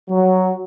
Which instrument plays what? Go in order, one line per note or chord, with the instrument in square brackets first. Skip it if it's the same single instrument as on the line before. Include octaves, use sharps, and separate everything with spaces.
[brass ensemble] F#3